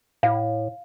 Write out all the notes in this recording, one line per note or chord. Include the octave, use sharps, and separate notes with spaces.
A2 F5